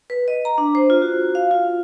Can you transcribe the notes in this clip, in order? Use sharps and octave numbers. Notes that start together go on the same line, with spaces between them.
B4
D#5
A#5
D4
C5
F4
F#4
F5
F4